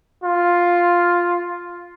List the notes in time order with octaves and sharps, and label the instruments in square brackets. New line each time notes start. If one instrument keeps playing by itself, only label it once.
[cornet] F4